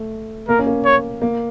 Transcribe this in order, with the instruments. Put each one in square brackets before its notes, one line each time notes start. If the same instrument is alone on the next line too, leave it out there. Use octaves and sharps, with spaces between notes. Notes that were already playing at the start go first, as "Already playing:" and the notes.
Already playing: [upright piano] A3
[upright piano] A#3 [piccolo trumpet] A#4
[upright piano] C#4
A#3
[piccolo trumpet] C#5
[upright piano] A#3